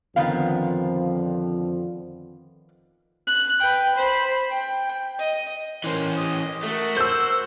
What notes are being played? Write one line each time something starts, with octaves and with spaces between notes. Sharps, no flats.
F2 D3 D#3 F3 B3 F5
F#6
B4 G5
C5 B5
G5
D#5
E3 C#4 A#4 C5
G4 D#5
A3 F#4 A#4
C5 E6 G6